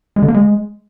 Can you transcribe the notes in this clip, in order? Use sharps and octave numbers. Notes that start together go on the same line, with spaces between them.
G#3
D3
A#3
G#3